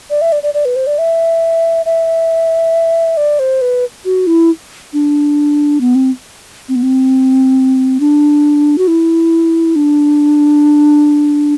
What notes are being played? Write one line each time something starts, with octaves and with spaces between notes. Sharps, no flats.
D5
E5
D5
D5
D5
B4
C5
D5
E5
E5
D5
C5
B4
F#4
E4
D4
B3
C4
C4
B3
C4
D4
F#4
E4
D4